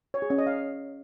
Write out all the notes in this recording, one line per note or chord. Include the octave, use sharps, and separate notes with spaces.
C#5
G#4
C#4
D#5
F5